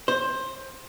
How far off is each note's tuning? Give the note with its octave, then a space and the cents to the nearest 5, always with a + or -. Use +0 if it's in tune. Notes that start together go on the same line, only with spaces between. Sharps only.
C5 +15